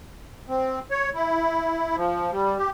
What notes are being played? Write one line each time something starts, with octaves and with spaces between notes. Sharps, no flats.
C4
C#5
E4
F3
G3
G4